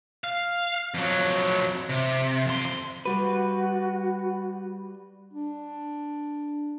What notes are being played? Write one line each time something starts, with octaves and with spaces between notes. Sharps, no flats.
F5
F2 F#3
C3
F2 C6
G3 F#4 B4
D4